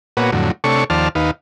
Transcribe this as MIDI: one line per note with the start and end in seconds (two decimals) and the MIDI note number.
0.17 0.31 46
0.17 0.31 58
0.17 0.31 59
0.17 0.31 66
0.17 0.31 71
0.17 0.31 73
0.32 0.51 41
0.32 0.51 45
0.32 0.51 50
0.32 0.51 54
0.64 0.84 48
0.64 0.84 57
0.64 0.84 62
0.64 0.84 69
0.64 0.84 73
0.64 0.84 85
0.90 1.08 39
0.90 1.08 53
0.90 1.08 72
0.90 1.08 74
0.90 1.08 81
0.90 1.08 89
1.15 1.31 39
1.15 1.31 63
1.15 1.31 71
1.15 1.31 77